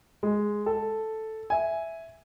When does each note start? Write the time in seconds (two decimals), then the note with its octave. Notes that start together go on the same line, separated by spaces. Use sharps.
0.23 G#3
0.66 A4
1.50 E5 G#5